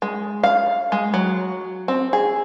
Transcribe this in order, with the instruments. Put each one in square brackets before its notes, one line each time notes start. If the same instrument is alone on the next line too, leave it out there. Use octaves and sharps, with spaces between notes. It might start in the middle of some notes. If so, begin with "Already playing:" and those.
[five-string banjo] G#3
F5
G#3
F#3
C4
G#4